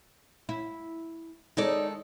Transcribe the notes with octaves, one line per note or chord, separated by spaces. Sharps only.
E4
D#3 G#3 D#4 A4 D5